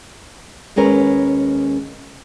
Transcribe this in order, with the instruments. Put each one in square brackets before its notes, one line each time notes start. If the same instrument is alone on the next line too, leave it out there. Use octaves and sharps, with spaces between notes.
[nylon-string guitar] D#2 G#3 C#4 A#4 B4